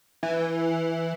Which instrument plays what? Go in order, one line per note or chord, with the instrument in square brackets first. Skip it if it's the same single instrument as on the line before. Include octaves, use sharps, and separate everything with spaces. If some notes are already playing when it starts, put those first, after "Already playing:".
[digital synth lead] E3